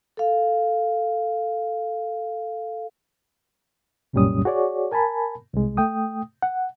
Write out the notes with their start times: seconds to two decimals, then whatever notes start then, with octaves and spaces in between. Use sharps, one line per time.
0.17 A4 F5
4.13 C2 F#2 A#2 G3 C#4 D#6
4.45 F#4 G#4 C#5 D5
4.91 A#4 G#5 A5 B5
5.53 C2 G#3
5.77 A3 G5 D#6
6.42 F#5